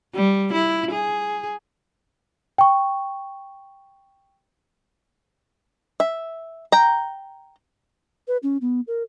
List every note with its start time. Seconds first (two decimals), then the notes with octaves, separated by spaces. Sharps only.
0.14 G3
0.53 E4
0.91 G#4
2.58 G5 C#6
6.00 E5
6.72 G5 A#5
8.28 B4
8.43 C#4
8.61 B3
8.87 A#4